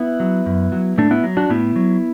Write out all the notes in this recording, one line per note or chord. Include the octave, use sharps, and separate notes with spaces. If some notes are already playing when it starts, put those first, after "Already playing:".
Already playing: B3 E4
F#3
F#2
F#3
A2 A3 D4
B3 E4
F#3
D4 F#4
A2 B3 E4
F#3